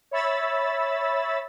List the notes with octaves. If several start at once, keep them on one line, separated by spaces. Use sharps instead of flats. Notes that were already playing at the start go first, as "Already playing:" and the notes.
C#5 E5 B5 E6 A6